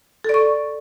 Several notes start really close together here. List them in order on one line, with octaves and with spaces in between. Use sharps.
A4 D5 C#6